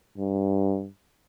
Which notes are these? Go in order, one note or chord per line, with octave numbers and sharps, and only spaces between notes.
G2